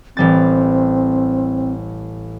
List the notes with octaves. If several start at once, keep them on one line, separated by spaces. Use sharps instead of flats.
A1 G3 C4 A6